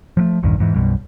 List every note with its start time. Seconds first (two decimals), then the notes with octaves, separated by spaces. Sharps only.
0.17 F3 F#3 A3
0.43 A#1 E2 G2 D#3
0.58 E2 G#2 E3
0.76 B1 F#2 B2 G3